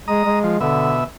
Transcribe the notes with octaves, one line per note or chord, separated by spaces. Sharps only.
G#3 A#5 D#6
G#3
F3
B2 D3 E5